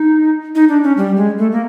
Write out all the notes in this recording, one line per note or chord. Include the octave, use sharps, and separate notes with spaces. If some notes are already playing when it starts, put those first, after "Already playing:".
Already playing: D#4
D#4
D4
C#4
G3
G#3
A3
A#3